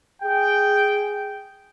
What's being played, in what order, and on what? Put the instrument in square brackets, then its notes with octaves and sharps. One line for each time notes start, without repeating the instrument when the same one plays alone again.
[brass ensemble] G#4 G5